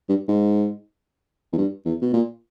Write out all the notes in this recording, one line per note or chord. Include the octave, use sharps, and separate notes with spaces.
G2
G#2
E2
G2
E2
B2
A#2